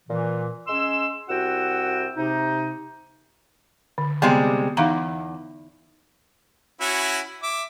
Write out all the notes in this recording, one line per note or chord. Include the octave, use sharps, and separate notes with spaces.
A#2 E3
G#3 C#4 C6 E6
C2 F#4 F#5 G5 E6
C3 D#4
D3
C3 G3 G#3 B3 D#5
E2 D#4 F5 A#5
C#4 E4 F#4
E5 D6